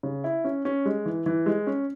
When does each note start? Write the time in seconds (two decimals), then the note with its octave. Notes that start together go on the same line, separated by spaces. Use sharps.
0.03 C#3
0.24 E4
0.44 C#4
0.65 C#4
0.86 G#3
1.06 E3
1.26 E3
1.46 G#3
1.67 C#4